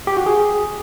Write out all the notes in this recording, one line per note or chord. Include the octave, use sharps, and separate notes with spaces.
G4
F#4
G#4